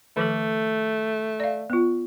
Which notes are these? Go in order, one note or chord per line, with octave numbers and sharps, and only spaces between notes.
D#3 F3 A3 A4
D5 F5
B3 F4